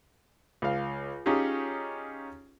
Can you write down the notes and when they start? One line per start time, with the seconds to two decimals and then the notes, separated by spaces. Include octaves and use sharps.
0.62 C#2 F5
1.26 C#4 D#4 F4 G4 G#4